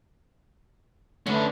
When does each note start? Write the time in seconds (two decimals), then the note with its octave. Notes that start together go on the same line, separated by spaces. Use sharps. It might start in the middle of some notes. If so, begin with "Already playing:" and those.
1.27 D3 A3 C#4 B4